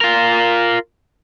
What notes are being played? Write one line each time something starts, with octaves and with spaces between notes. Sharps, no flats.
F4 A#4